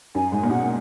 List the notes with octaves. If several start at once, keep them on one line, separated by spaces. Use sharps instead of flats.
F#2 G#5
G#2 G#5
A#2
B2 F#5